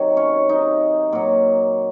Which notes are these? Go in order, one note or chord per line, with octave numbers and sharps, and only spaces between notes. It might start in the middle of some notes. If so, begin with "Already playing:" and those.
Already playing: C3 D#3 F#3
C#4 C#5
D#4 D#5
A#2 F#3